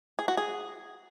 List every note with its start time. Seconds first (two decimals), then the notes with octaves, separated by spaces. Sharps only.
0.19 G#4
0.28 F#4
0.37 G#4